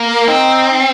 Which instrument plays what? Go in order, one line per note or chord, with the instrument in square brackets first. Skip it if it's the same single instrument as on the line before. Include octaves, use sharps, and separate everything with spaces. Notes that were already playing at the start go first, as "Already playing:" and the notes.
Already playing: [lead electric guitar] A#3
[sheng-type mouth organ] A#4
[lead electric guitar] C4 [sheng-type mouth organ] D#4